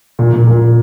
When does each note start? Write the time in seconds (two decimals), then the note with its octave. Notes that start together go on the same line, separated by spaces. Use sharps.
0.19 A#2
0.33 A#2
0.47 A#2